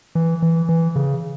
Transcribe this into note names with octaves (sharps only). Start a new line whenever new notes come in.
E3
E3
E3
C#3